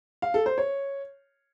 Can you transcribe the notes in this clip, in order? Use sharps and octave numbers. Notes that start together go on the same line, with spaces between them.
F5
A4
C5
C#5